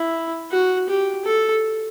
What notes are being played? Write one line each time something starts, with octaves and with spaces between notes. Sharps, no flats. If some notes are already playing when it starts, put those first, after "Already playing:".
Already playing: E4
F#4
G4
A4